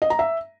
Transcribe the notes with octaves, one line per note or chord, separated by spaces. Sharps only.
D#5
A#5
E5